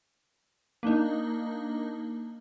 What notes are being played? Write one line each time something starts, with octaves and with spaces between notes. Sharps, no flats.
A#3 D4 D#4